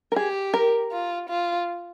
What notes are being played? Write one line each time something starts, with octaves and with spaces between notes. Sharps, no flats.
A#4
G4 G#4
A#4
F4
F4